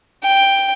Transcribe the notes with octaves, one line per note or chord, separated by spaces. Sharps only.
G5